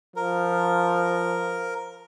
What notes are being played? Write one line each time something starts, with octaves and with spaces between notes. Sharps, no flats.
F3 A#4